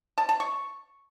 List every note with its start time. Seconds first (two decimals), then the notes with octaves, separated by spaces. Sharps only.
0.18 A5
0.29 A5
0.40 C#6